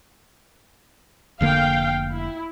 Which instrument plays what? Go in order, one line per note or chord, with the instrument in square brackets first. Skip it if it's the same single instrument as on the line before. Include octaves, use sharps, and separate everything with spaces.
[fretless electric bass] F1 D3 A#3 [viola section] F5 G5
[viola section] E4